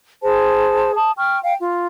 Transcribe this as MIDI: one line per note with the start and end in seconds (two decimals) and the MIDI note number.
0.23 0.95 68
0.23 0.95 72
0.23 0.95 81
0.95 1.11 81
0.95 1.11 87
1.18 1.38 79
1.18 1.38 85
1.18 1.38 89
1.43 1.53 77
1.43 1.53 79
1.60 1.87 65